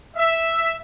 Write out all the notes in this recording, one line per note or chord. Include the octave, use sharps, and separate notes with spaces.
E5